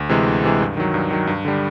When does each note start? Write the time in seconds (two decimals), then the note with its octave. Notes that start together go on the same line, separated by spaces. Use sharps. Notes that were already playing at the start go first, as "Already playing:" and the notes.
Already playing: D2
0.09 C3 E3 G#3
0.26 D2
0.44 C3 E3 G#3
0.61 G2
0.77 D#3 F#3
0.94 G2
1.11 D#3 F#3
1.27 G2
1.45 D3 G3